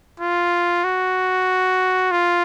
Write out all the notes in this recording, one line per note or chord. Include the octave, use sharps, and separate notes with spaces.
F4
F#4
F4